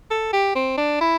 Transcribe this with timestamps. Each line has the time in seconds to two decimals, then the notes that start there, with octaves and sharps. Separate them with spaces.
0.11 A4
0.33 G4
0.56 C4
0.78 D4
1.01 E4